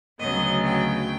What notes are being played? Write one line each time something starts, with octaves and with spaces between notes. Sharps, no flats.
D2 C#3 F#3 B3 D#5
G5